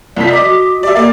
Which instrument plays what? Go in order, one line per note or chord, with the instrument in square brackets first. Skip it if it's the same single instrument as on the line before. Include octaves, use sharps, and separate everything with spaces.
[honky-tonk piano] C2 F3 B6 [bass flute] D5
[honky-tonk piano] D#5 D6
[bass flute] F#4
[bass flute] G4 [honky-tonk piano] D5 E5
[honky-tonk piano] A#3 D5 [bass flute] A#4